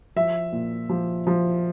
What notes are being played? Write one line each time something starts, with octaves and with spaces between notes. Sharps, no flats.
F3 E5
A#2
F3
F3